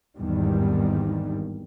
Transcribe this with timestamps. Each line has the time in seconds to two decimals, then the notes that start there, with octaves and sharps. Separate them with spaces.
0.17 G#1 E2 G2 D#3 G3